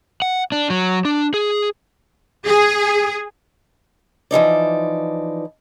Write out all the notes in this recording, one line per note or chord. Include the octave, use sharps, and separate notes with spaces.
F#5
D4
F#3
D4
G#4
G#4
E3 F3 D#4 D5